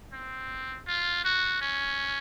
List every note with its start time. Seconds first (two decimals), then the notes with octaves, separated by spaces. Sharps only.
0.13 C4
0.87 F4
1.24 F#4
1.61 C#4